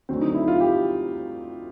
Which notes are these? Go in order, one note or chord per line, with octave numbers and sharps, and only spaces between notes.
D2 D3 F#3 C4
D#4
E4
F4
G4